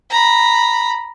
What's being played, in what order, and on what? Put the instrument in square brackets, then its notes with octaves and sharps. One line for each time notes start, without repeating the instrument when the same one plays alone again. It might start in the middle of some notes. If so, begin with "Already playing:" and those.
[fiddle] A#5 B5